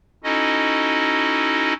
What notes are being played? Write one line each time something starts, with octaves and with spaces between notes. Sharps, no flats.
C#4 D#4 E4 F#4 A4 D#5